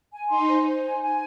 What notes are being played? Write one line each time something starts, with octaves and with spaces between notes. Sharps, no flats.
G#5
D#4 C6
C5
C5
G#5
G#5